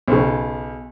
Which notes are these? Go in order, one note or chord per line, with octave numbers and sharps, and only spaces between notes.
B1 C#3